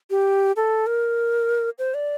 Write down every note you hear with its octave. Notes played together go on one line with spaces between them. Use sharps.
G4
A4
A#4
C5
D5